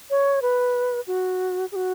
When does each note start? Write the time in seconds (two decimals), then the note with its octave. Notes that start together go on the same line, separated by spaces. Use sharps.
0.10 C#5
0.42 B4
1.07 F#4
1.72 G#4
1.76 F#4